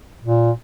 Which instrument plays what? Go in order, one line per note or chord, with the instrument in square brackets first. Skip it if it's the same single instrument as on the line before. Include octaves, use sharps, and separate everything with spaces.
[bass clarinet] A#2